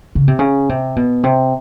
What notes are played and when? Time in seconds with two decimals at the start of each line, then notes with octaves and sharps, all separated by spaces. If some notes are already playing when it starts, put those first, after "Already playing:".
0.15 C#3
0.28 C3
0.39 C#3
0.69 C3
0.96 B2
1.24 C3